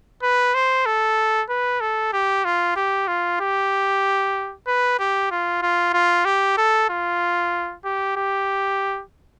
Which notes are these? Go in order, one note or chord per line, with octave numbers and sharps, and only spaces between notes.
B4
C5
A4
B4
A4
G4
F4
G4
F4
G4
B4
G4
F4
F4
F4
G4
A4
F4
G4
G4